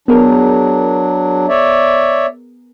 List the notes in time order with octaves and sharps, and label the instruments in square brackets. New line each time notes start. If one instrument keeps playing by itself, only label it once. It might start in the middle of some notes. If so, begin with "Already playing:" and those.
[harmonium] F#3 D4 [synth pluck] B3 G#4 A#4
[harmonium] C#5 D5 E5